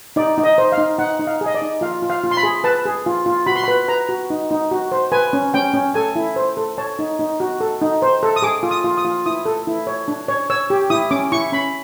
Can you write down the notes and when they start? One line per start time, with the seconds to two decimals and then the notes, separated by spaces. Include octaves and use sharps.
0.16 D#4 D5
0.38 D#4
0.44 D#5
0.58 C5
0.72 F5
0.78 D#4
0.99 D#4 F#5
1.19 D#4
1.27 F5
1.41 G#4
1.46 D#5
1.54 D5
1.62 D#4
1.81 F4 F5
2.02 F4
2.10 F5
2.24 F4
2.31 C6
2.37 B5
2.43 G#4
2.64 B4 A5
2.85 G#4
3.06 F4
3.26 F4
3.46 F#4 B5
3.56 C6
3.64 B4 B5
3.88 B4 A#5
4.09 F#4
4.30 D#4
4.51 D#4
4.71 F#4
4.92 C5
5.12 B4 G#5
5.33 C#4
5.54 C#4 G5
5.74 C#4
5.94 A4 G#5
6.16 E4
6.36 C5
6.57 A4
6.78 C#5 A5
6.99 D#4
7.20 D#4
7.40 F#4
7.61 A4
7.81 D#4
8.02 C5
8.23 A4
8.36 D#6
8.42 G#4 D6
8.63 F4
8.71 D#6
8.84 F4
8.97 D#6
9.05 F4
9.26 E4 D#6
9.46 A4
9.67 E4
9.87 C#5
10.08 D4
10.28 C#5
10.50 C#5 E6
10.70 G4
10.90 E4 D#6
11.11 C#4 D6
11.32 E4 C#6
11.52 C#4 B5